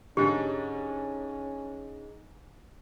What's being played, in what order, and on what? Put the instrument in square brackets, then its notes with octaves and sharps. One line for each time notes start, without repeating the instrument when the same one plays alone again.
[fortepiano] G#2 D3 [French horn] C#4 [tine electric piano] D#4 G#4 [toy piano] G4